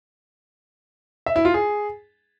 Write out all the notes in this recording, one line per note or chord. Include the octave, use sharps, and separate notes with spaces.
E5
E4
F4
G#4